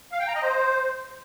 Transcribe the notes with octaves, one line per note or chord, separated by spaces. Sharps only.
F5
G5
A#5
D#5
C5